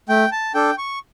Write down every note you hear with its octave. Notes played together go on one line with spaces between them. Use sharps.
A3 G5
A5
D4 A4 G5
C#6